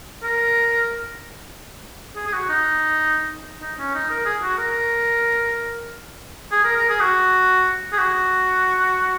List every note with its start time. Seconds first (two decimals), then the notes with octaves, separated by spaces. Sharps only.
0.23 A#4
2.16 G#4
2.27 G#4
2.33 F#4
2.49 D#4
3.61 D#4
3.78 C#4
3.95 D#4
4.11 A#4
4.26 G#4
4.43 F#4
4.58 A#4
6.52 G#4
6.65 A#4
6.77 A#4
6.89 G#4
7.00 F#4
7.93 G#4
7.98 F#4